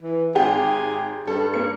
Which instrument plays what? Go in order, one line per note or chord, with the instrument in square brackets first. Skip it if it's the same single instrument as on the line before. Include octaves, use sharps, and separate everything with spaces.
[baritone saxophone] E3
[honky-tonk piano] G#1 G4 [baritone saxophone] G#4
[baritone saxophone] G2 [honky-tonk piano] A4
[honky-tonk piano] A#3 C#7